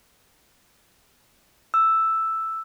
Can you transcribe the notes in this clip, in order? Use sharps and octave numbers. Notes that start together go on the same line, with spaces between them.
E6